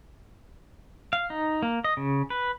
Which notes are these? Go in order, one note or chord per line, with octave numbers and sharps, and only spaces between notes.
F5
D#4
A#3
D#5
C#3
B4